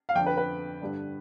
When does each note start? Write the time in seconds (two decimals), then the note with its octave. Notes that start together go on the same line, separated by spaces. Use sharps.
0.09 F5
0.15 F2 D3 G5
0.26 B4
0.37 B4
0.81 G2 D3